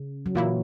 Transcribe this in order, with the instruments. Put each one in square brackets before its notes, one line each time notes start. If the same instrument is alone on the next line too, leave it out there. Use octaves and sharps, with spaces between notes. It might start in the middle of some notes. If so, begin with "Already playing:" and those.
Already playing: [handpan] C#3
F#3
[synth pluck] A#2 A#3 E4 [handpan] E3